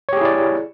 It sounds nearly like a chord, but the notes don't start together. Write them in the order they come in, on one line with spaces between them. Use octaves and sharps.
C#5 G4 G#4 E4 D5